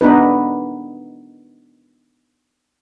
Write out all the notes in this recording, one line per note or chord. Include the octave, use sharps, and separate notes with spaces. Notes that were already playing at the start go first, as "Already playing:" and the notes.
B3 D4 D#4 B4